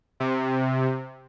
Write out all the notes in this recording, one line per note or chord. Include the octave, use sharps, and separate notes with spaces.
C3